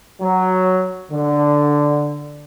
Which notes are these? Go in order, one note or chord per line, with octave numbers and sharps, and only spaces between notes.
F#3
D3